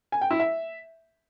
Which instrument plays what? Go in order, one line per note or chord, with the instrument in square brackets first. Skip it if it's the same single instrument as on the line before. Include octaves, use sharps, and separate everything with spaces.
[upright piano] G#5
G5
E4
E5